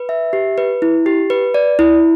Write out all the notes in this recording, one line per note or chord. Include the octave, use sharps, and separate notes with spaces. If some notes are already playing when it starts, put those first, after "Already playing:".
Already playing: B4
E5
G4
B4
E4
G4
B4
D5
E4